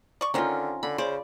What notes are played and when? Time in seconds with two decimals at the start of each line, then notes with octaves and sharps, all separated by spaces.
0.21 D5 C#6
0.34 D3 D#3 C4 C#4 F4 A#4
0.83 D3 B5
0.98 C#3 C5 D5